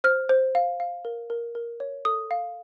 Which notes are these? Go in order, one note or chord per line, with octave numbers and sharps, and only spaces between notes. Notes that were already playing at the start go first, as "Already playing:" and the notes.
C5 F6
C5
F5
F5
A#4
A#4
A#4
C#5
A4 D#6
F5